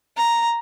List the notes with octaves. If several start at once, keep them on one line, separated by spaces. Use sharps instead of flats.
A#5